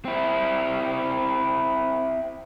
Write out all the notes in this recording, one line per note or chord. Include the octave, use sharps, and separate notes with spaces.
C4 E4